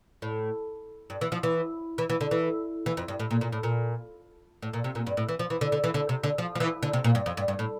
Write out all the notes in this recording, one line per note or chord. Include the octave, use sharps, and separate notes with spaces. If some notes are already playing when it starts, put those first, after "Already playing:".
A2
G2
E3
F3
E3
E3
E3
D3
E3
E3
F2
G2
A2
A#2
A#2
A2
A#2
A2
A#2
C3
A#2
G2
A2
E3
F3
E3
D3
D3
E3
D3
C3
D3
F3
F3
E3
D3
C3
A#2
G2
F2
G2
G2
A2